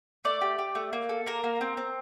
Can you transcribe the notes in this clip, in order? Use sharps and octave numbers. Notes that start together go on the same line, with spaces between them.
A3 D5
G4
G4
A3
A#3
A4
A#3 A#4
A#3
C4
C4